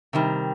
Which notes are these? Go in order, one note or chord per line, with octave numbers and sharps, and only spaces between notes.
C3 D#3 G3